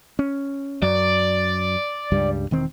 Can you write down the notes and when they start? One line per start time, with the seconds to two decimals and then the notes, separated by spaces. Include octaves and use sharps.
0.19 C#4
0.82 F#2 F#3 D5
2.12 C#2 G2 G3
2.51 E1 D#3 C4